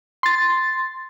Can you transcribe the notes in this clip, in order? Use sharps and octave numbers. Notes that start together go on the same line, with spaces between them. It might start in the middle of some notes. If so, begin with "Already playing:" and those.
C6 A6